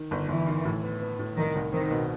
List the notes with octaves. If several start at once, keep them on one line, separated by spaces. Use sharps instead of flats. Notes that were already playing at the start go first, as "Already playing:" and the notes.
Already playing: D#3
G1
G1 E3
D#3
A2
B3
B3
A2
C2 D#3
C2
D#3 C4
B2